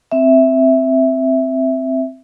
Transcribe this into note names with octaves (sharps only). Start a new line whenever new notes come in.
C4 E5